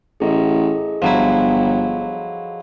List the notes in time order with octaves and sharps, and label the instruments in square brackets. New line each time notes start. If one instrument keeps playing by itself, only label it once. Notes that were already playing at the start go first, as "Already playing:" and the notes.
[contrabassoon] A1 [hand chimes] G#4 A4 D#5
[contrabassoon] G1 [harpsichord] F3 F#3 E4